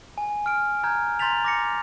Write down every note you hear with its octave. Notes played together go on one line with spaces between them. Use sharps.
G#5
F6 D7
A#5 F6 G6 G#6
A#5 C6 G6 A6 B6 F7
D6 A#6 C#7